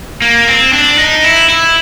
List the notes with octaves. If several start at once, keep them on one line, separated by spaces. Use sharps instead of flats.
A#3
C4
D4
D#4
E4
E4